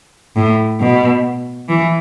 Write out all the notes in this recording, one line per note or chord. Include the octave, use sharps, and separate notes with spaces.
A2
B2
E3